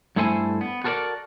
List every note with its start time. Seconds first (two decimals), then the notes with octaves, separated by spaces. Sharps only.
0.16 G2 A3 E4 A4 C5 G#5
0.61 B3
0.84 F#4 A4 A#4 C5 D5